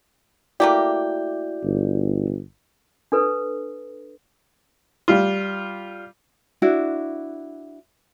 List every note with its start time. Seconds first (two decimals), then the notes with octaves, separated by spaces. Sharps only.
0.60 A3 A#3 E4 F#4 G4 D5
1.64 G1
3.12 D4 A4 B4
5.08 G3 F4
6.62 D4 E4 F#4